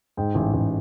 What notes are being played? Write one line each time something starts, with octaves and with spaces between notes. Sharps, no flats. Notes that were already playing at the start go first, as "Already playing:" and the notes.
G#2 G5
A1
A1